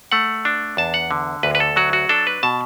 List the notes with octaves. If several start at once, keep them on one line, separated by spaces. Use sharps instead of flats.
A3 F#5
D4
E2 A5
F#5
D3
D2 B4
B4
A4
F#3 F#4
F#4
D4 A4
B4
B2 A5